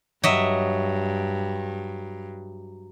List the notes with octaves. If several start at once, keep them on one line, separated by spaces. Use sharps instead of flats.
G2 F#3 D#5 E5